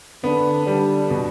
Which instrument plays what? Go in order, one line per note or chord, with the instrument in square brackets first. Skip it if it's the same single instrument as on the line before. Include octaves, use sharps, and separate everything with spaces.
[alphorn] D3 [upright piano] B3
[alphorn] D3 [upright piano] G3
[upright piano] B2